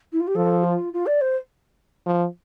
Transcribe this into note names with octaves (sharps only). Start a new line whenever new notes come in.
E4
F4
G4
F3 A4
F4
F4
D5
C5
F3